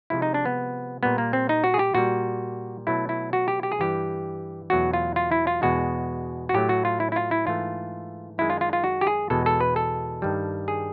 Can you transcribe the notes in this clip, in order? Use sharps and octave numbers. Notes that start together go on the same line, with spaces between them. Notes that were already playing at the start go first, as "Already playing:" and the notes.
C3 F3 G#3 E4
D#4
D4
B3
A#2 G3 B3
A#3
C4
D#4
F#4
G#4
G4
A#2 G3 F#4
B2 F#3 A3 E4
E4
F#4
G4
G4
G#4
G2 E3 G3 G4
E2 B2 F#3 A3 F#4
F4
F4
E4
F4
E2 B2 G#3 F#4
F#4
A2 F#3 A3 G4
F#4
F4
E4
E4
F4
E4
G#2 E3 A3 F4
F#2 D#3 G#3 E4
F4
F4
F4
F#4
G4
G#4
E2 B2 G#3 A4
A4
B4
A4
G2 D#3 G3
G#4